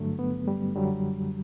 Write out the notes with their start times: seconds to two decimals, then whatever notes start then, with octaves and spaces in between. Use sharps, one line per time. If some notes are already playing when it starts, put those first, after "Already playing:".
Already playing: G2 D3 F#3 A3
0.19 B3
0.48 G3
0.76 F#2 D3 F#3 G3